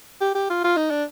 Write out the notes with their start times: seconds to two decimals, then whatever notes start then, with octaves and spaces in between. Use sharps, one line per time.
0.21 G4
0.35 G4
0.50 F4
0.64 F4
0.77 D#4
0.90 D4